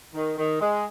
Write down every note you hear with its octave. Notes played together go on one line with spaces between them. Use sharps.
D#3
D#3
G#3